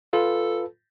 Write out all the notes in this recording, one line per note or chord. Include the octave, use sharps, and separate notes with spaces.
F4 A4 B4